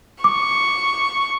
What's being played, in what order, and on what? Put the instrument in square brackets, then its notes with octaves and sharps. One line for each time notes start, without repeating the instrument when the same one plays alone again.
[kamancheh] C#6 [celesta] D6